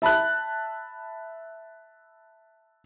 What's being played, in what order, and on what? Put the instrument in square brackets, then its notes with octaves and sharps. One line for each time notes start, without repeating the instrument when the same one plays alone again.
[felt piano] E5 A5 B5 F#6